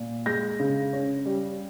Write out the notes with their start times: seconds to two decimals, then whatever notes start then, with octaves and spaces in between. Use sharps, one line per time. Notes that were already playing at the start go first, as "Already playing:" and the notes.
Already playing: A#2
0.26 G#3 G6 A#6
0.60 C#3
0.93 C#4
1.26 G3